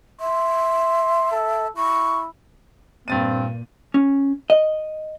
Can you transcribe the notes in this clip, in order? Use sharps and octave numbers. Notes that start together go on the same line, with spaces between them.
E5 C6
A4
E4 C#6
G2 A#2 C4 A6 D#7
C#4
D#5